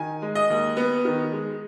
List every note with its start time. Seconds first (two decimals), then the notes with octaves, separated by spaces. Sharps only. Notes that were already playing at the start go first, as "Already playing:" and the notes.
Already playing: D#3 G#5
0.22 G#3
0.35 D#5
0.50 D#2
0.77 B3
1.05 D#3
1.33 G#3